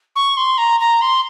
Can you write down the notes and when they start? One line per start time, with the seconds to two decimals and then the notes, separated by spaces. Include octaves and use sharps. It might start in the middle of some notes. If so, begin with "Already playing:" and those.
0.16 C#6
0.37 C6
0.58 A#5
0.80 A#5
1.01 C6